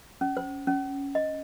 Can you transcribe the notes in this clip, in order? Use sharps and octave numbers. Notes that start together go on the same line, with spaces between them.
C#4
C5
C#4
D#5